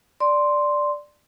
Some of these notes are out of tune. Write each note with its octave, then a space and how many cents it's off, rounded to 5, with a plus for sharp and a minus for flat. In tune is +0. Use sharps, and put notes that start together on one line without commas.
D5 +0 C6 +0